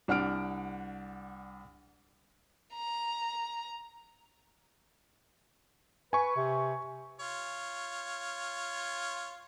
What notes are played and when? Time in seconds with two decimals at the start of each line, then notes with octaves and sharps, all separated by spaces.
0.08 C2 D4 F#5 F6 D7
2.74 A#5
6.13 B4 G#5 C#6
6.36 C3
7.20 F4 C#5